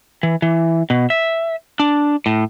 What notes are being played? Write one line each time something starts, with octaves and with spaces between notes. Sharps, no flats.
E3
E3
B2
E5
D4
A2